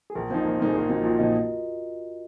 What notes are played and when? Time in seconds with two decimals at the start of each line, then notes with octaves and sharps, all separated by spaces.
0.10 G#4
0.15 A#1 A#4
0.30 A#2 F3 A#3 D#4 C5
0.45 A#1 A#4
0.59 A#2 F3 A#3 D#4 A#4
0.67 G#4
0.74 A#1 A#4
0.89 A#2 F3 A#3 D#4 F#4
1.03 A#1 F4
1.18 A#2 F3 A#3 D#4 D#5